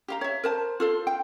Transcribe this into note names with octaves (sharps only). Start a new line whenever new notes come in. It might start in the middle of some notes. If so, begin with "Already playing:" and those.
G4 F5 A#5
C#5 E5
A#4 C5 A5
F4 A4 C5
G5